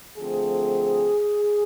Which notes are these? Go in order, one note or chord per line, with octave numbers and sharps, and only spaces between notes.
D3 F3 A3 C4 G#4